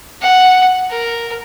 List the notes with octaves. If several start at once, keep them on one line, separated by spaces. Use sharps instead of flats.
F#5
A#4